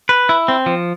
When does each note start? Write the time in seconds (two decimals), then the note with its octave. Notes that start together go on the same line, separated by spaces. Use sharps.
0.09 B4
0.29 E4
0.48 C4
0.66 F3